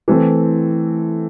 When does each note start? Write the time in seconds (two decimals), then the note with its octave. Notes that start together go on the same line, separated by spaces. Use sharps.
0.08 E3 A3 C4